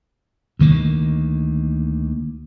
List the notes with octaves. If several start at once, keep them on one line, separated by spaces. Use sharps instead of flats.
D2 D#3 A#3